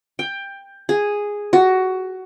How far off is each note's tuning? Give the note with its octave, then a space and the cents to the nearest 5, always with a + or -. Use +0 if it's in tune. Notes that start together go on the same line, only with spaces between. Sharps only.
G5 +15
G#4 -5
F#4 +15